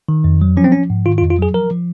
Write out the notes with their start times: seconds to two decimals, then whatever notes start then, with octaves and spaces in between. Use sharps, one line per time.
0.09 D#3
0.24 F2
0.42 F#3
0.57 F3 C#4
0.64 C4
0.72 F3 C#4
0.90 G#2
1.06 D#3 F4
1.18 F4
1.22 F2
1.30 F4
1.39 F#3 G#4
1.54 F3 A#4
1.71 F3